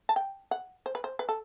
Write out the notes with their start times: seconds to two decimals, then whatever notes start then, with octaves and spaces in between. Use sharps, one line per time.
0.09 A5
0.16 G5
0.51 F#5
0.86 C5
0.95 B4
1.04 C5
1.19 B4
1.29 A4